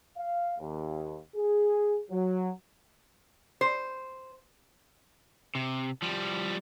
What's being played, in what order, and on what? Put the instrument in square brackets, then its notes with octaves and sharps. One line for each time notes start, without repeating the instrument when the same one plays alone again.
[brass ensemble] F5
D#2
G#4
F#3
[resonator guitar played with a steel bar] C5
[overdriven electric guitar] C3
F3 G3